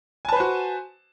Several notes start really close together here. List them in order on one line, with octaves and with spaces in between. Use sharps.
G#5 A5 B4 C5 F#4